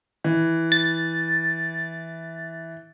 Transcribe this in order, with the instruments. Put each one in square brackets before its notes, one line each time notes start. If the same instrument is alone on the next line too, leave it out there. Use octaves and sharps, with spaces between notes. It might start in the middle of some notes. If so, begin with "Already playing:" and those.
[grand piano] E3
[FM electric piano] A6